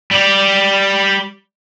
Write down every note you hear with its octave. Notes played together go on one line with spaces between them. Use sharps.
G3 G4